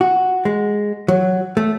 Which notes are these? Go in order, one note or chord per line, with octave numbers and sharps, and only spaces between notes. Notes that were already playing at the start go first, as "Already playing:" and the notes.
F#4
G#3
F#3
A3